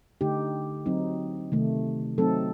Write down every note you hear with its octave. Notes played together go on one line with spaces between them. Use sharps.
D3 A3 D#4 G4
F#3 C4 D#4
C3 D#3 A3
F#3 A3 C4 D#4 A4